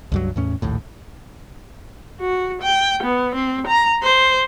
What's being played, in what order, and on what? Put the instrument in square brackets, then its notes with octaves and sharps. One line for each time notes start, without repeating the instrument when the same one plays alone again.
[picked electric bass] C#2 G2 F#3
E2 A2 C#4
A#1 D#2 A2
[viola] F#4
G5
B3
C4
A#5
C5